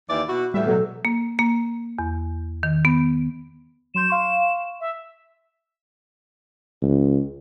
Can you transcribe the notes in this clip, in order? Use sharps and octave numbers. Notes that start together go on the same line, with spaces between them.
D#2 E3 D5
B2 E4 F#4
E2 A2 G3 E5
B2 F#3 A4
A#3
A#3
E2
D#3
B3
F#3 C6 G6 E7
F5 C6 C#6
E5
C#2